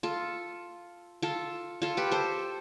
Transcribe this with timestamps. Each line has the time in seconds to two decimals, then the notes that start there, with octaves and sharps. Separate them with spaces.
0.03 F4 A4
1.22 F4 A4
1.82 F4 A4
1.97 G4 B4
2.11 A4 C5